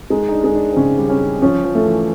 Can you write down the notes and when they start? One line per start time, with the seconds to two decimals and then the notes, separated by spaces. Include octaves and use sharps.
0.10 G#3 D#4
0.29 D#4
0.32 D4
0.44 G#3
0.55 D4
0.72 C4
0.76 C#3 C#4
0.98 G3
1.09 C#4
1.42 F3 C#4
1.64 F3
1.75 A3
1.86 E3